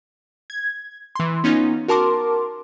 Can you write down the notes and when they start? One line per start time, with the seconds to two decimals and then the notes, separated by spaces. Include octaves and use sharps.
0.50 G#6
1.15 E3 C6
1.44 B3 C#4 D#4 F4
1.88 F#4 A#4 A5 C6 D6